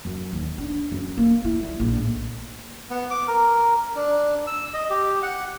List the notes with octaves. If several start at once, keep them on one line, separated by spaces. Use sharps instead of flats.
F#2
D#2
D4
F#2
A#3
E4
G3
A#1
A2
B3
D6
A#4
D4
E6
D#5
G4
F#5